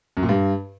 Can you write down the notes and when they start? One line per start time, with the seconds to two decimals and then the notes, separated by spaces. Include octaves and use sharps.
0.17 F#2
0.23 A#2
0.29 G2